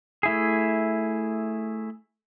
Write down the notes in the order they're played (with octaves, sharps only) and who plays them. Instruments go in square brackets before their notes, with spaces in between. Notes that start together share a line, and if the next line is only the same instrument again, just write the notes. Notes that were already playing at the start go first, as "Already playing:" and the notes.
[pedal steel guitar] A3 E4 G#4